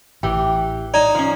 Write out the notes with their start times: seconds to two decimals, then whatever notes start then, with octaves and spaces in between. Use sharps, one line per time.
0.23 A1 E3 G4 G5
0.94 D#4 D5 A#5
1.15 F3 C#4